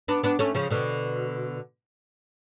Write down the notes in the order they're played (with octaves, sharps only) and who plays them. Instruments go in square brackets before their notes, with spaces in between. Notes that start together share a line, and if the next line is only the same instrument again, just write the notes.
[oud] B3 D4
B3 D4
A3 C#4
C#3 F3
B2 D3